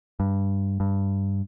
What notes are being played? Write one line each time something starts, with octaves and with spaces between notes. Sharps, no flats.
G2
G2